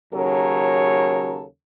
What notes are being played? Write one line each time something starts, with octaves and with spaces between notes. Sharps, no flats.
D#2 C#3 F#3 A4 A#4 C#5